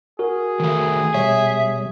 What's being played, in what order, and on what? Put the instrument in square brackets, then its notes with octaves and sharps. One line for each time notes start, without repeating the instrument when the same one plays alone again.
[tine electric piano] F#4 A#4 [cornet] G#4
[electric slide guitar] D#3 A3
[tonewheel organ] B2 G3 [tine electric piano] C#5 [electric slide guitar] E5